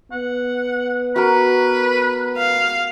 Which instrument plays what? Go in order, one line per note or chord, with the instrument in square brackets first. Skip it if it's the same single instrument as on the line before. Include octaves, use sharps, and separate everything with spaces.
[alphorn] B3 [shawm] F#5
[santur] F#4 A#4 [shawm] B4
[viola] F5